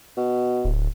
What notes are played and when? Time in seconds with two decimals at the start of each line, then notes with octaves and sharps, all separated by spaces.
0.17 B2
0.65 D1